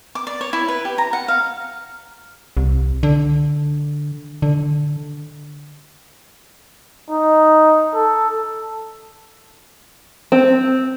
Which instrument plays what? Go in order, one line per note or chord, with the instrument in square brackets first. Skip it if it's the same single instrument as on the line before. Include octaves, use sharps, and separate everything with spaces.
[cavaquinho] D6
D5
C#5
E4
B4
G4
A#5
F#5
F5
[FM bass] C2
D3
D3
[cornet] D#4
A4
[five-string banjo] C4